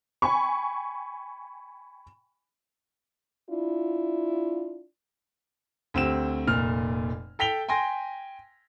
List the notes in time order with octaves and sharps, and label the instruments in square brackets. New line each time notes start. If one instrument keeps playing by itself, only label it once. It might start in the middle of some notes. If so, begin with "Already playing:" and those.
[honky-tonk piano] G5 G#5 B5 C#6
[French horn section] D4 E4 F4
[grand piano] D2 C4 G4 E7
F1 A#2 F6
A4 G5 B6 F7 G7
G5 G#5 C6 A#6